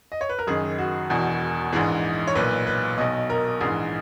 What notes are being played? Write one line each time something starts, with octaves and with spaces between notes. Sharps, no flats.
D#5
C#5
B4
A#4
F#1 F#2 D#3 G#4
F#4
E1 E2 B2
A#1 G#2 E3 G#4
C#5
B1 A#2 B4
B4
B1 B2 D#5
A#4
A#1 G#2 E3 G#4